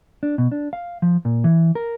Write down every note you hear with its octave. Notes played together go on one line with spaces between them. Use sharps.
D4
B2
D4
F5
F3
A#2
E3
A#4